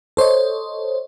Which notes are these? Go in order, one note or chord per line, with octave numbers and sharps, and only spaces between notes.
A4 C5 C#5 D#5